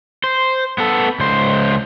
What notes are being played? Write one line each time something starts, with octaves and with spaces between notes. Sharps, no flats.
C5
B3 A4
C#2 C5